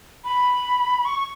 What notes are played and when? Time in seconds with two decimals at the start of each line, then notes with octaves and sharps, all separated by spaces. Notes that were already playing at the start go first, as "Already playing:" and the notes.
0.24 B5
1.05 C#6